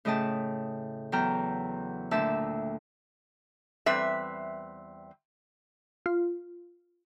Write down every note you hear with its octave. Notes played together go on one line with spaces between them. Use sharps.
A2 C#3 A3 D#5 G5 A5
E2 F#3 A4 G5 A#5 F6
D2 A#2 E5 G5 A5 E6
E2 G3 C4 B4 E5
F4